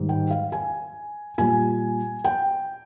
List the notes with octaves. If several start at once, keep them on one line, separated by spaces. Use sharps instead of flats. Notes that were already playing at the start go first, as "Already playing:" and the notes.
Already playing: G#2 D#3 G3
G5
F5
G#5
A#2 G3 G#5
G5